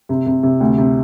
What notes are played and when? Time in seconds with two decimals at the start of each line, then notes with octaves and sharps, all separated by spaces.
0.09 C3
0.26 C3
0.43 C3
0.60 D2
0.78 C3